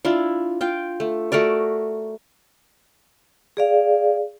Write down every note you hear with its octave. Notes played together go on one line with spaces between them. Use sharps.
D4 E4 F4
F4 G5
A3
A3 F#4 A#4 D5
G#4 D5 F5